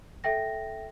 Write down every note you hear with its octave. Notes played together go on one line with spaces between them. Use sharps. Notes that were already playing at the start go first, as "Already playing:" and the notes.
A4 E5 G5 A#6